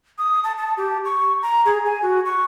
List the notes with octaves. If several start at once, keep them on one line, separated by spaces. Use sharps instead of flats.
D#6
A5
A5
G4
C#6
A#5
G#4
G#5
F#4
C#6